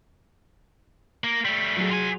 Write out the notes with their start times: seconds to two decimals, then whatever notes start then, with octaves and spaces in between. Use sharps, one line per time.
1.24 A#3
1.45 G3 A3
1.77 F#3 G#4
1.91 F4 G#5